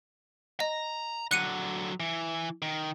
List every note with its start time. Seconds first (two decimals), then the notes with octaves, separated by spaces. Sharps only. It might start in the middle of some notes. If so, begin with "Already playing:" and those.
0.60 D#5 A#5
1.31 D3 F#3 F#6 C#7 D#7
2.00 E3
2.62 D#3